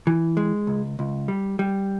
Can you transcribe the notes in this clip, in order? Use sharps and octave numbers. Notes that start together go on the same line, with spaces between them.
E3
G#3
C#2
C#2
G3
G3